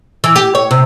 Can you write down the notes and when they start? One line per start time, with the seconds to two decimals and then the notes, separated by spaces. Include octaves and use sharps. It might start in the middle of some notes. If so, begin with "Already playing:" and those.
0.24 E3
0.36 G4
0.55 C#5
0.71 C3